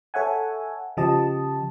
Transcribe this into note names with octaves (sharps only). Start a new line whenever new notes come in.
A4 C#5 E5 F#5 G#5
C#3 F3 G4 D#5 A5